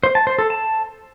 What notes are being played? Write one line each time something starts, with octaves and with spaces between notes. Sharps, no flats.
C5
A5
C5
A4
A5